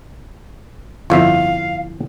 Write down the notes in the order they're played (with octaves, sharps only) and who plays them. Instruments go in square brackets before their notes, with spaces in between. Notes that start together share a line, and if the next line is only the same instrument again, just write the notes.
[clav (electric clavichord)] G1 F2 E5 [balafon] E4 [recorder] F5